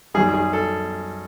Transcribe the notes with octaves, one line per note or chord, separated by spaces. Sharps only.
F#2 D#3 G3 G#4
G#4
A4